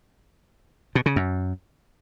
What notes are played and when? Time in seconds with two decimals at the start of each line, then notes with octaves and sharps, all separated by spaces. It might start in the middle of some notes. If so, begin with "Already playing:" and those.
0.95 B2
1.06 C#3
1.16 F#2